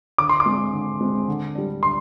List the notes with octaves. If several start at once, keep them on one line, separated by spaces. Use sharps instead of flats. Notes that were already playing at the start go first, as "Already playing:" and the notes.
D3 D6
C6
D6
G#3 C4
D3
G#3 C4
D3
G3 D4
D3 C6